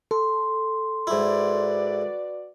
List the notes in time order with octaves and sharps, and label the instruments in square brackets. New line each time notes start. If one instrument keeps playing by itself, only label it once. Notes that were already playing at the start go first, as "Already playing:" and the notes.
[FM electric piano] A4 [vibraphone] C6
[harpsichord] G#2 E4 [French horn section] F#4 B4 D5